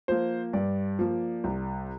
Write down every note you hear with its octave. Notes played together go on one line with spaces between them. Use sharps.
F3 A#3 C5
G2 D5
F3 A#3
C2